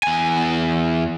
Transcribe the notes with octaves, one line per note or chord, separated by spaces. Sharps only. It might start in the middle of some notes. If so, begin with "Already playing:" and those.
E2 G#5